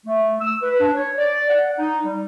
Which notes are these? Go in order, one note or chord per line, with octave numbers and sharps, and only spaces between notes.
A3
E6
B4
D4
C#5
D5
F#5
D#4
G3